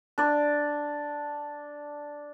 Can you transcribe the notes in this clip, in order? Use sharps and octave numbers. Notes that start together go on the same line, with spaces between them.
D4 D5